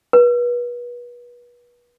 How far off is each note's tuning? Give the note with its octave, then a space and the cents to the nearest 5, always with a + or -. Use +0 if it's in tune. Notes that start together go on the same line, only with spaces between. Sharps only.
B4 -30